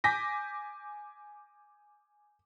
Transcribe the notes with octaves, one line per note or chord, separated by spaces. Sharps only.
G#5 D6 G6 A#6 B6